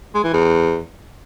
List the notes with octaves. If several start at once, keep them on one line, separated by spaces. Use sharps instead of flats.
G#3
E3
E2